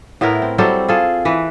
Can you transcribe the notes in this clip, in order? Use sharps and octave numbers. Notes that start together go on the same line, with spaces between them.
A2 B3 E4 A#4
C4
F#3 G3 C4 A4
F4 G#4 A4
E3 B4